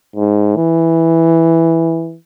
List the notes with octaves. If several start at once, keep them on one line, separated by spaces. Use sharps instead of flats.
G#2
E3